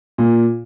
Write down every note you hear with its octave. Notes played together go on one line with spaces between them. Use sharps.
A#2